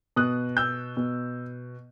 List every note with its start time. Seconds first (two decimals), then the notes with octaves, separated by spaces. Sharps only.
0.16 B2 D#6 F#6
0.57 E6 G6
0.97 B2